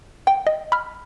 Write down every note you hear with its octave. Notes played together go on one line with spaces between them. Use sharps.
G5
D#5
B5 F6